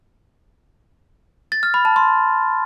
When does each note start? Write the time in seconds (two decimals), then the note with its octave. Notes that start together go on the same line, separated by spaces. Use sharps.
1.52 A6
1.63 F6
1.74 B5
1.85 A5
1.96 C6